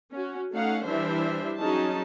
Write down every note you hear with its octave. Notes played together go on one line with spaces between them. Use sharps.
C#4 F#4
A3 C#4 D#4 F5 F#5
E3 G3 D4 C5 E5
F#3 C#4 D#4 G#4 A5